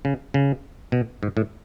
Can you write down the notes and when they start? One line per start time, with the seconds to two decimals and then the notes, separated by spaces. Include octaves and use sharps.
0.05 C#3
0.34 C#3
0.92 B2
1.23 G#2
1.37 A2